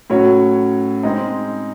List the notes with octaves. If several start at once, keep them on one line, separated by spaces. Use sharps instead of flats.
A2 F#3 C#4 F#4 C#5
G#3 C4 D#4